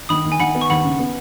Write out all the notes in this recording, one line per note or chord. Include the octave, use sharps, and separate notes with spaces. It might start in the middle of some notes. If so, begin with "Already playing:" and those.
D#3 B5 D#6
D#3
G#5
D#3 F#5 B5
B3
C#6
D#2 F#5 B5
C#3
B3